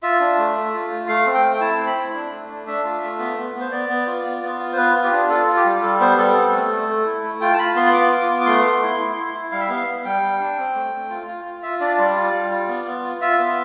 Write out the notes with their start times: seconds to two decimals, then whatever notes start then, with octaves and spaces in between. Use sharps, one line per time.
0.03 F4 E5
0.20 D4
0.38 A3
0.55 A3
0.74 F4
0.90 A3
1.08 A3 F5
1.26 C4
1.34 G5
1.43 A3
1.53 G5
1.60 E4 A5
1.78 C4
1.87 B5
1.96 E4
2.14 D4
2.31 A3
2.49 D4
2.67 D4 E5
2.84 F4
3.02 A3
3.19 B3
3.37 B3
3.55 B3
3.60 C5
3.71 B3 D5
3.89 B3
4.07 F4
4.24 B3
4.43 B3
4.59 F4
4.72 C5
4.77 B3 B4
4.95 F4
5.04 G4
5.12 D4
5.29 F4 A4
5.47 F4
5.56 G4
5.65 G3
5.82 G3 A4
6.00 B3 C5
6.17 G3 A4
6.36 C4
6.52 A3
6.71 A3
6.88 A3
7.06 E4
7.23 A3
7.41 F4 G5
7.54 A5
7.58 F4 B5
7.76 B3 C6
7.86 C6
7.93 F4 D6
8.12 F4
8.20 D6
8.29 B3
8.41 D6
8.46 A3 C6
8.64 A3
8.82 E4
9.00 E4
9.16 E4
9.34 E4
9.52 G3 F5
9.60 E5
9.69 B3 F5
9.87 B3
10.04 G3 G5
10.22 G3
10.39 D4
10.58 C4
10.74 A3
10.92 A3
11.10 F4
11.27 F4
11.45 F4
11.63 F4 E5
11.80 D4 D5
11.97 G3 D5
12.15 F4 D5
12.33 G3
12.51 F4
12.68 B3
12.86 B3
13.03 F4
13.21 F4 E5
13.38 B3